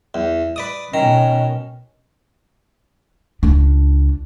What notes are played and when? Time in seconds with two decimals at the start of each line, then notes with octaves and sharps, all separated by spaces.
0.14 E2
0.56 B4 D5 D#6
0.94 B2 D#3 C#4 A#5
3.43 C#2 D4